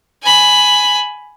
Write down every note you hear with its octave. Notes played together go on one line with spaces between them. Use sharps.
G#5 B5